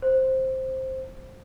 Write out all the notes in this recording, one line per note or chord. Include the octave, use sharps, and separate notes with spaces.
C5